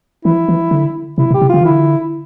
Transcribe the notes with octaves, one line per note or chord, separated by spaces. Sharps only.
E3 E4
E3
D3
C3 E4
B2
G4
C3
D3 F4
E3
D3 E4